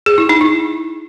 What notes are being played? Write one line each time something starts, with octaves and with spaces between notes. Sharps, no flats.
G#4
E4
D#4
E4